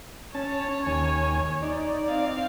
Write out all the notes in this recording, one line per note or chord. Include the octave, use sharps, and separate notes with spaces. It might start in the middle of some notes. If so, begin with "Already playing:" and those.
C#4 C#5 A5
D#2 G#5
D#4 D5
C4 F5